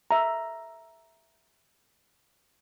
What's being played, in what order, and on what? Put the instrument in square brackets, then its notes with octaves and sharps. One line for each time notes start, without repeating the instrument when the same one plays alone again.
[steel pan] E5 A#5